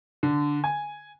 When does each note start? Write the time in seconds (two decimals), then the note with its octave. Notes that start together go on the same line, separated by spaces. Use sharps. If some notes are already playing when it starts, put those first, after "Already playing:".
0.23 D3
0.64 G#5